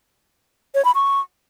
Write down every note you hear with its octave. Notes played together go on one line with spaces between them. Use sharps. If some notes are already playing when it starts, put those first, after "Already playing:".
C#5
B5
C#6